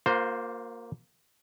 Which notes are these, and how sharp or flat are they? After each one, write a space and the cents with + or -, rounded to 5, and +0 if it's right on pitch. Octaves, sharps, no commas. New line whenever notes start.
A#3 +0 F4 +45 C5 +0